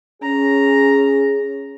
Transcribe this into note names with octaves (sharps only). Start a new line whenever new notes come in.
C#4 G#4 A#5